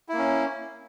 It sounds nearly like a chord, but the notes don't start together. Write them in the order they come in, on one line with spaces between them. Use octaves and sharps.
E4 A#3 C#4